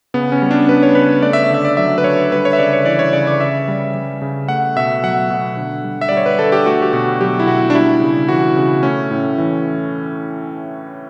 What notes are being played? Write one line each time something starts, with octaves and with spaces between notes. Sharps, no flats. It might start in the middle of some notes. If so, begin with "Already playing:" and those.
C#3 B3
C#4
G3
D4
G3 B4
C#5
C#3 B4
A3 D5
E5
D5
D3 E5
D5
F#3 E5
B4
D3 C#5
G3 B4
C#5
E5
C#3 D5
C#5
E3 D5
C#5
C#3 D5
D5
C#3 E5
G3
G3
C#3
A3 F#5
B2 E5
F#3 F#5
B2
D3
G3
E5
G3 D5
C#5
B4
D3 A4
G4
A3 F#4
G4
B2 F#4
F#3 G4
E4
B2 F#4
D4
G3 E4
C#3
E3 F#4
C#3
A3 C#4
A2
E3